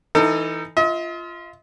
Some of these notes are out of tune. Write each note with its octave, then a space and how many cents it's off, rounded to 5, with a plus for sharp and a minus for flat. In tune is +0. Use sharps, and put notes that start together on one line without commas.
E3 -5 D#4 +0 A4 +30
F4 -15 D#5 +45